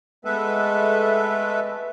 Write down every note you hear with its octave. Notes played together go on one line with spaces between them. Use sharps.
G#3 A3 B3 A4 B4 E5